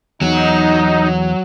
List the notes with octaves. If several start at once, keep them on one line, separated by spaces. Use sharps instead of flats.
E2 F#3 D#4 F#4